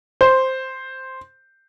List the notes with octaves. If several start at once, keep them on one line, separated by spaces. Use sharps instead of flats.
C5